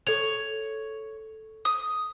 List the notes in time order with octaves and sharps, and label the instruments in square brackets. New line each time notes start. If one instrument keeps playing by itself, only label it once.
[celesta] A4 F7 [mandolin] C#5
[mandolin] D#6